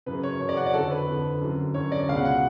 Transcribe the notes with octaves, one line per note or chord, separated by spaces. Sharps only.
F#2 C#3 B4
C#5
F#2 C#3 C#5
D5
F#5
D5
F2 D3 A4
B4
F2 D3
F#2 D3
F#2 D3 C#5
D5
C#2 B2 F5 F#5
F#5